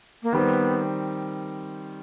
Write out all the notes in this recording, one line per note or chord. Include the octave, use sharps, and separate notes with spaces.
A#3
D#3 G3 B3 C4